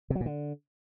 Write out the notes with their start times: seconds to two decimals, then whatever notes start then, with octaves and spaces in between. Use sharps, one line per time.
0.10 C3
0.15 F#3
0.21 A#2
0.26 D3